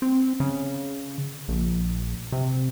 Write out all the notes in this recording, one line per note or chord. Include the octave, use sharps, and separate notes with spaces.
C4
C#3
A#1
C3